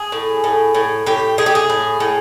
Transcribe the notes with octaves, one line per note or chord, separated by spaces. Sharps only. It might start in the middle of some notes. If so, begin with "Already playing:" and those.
Already playing: G#4
A2
A2
A2
A2 G4
A2 G#4
G4
G#4
A2
A2